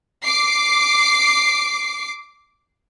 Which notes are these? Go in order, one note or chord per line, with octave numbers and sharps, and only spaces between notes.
D6 C7